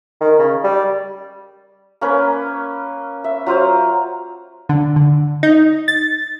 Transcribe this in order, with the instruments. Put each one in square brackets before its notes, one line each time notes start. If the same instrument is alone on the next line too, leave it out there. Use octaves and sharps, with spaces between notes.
[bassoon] D#3
C#3
G3
[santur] A#3 C#4 B4
E5
F#3 F4 C5 F5
[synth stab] D3
D3
D#4
A6